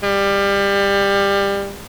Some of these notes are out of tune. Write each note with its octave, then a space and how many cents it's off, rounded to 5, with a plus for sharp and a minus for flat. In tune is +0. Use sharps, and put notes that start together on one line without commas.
G3 +25